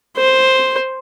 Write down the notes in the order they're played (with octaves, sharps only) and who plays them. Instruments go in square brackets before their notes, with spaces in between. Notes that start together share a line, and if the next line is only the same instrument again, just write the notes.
[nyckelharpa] C5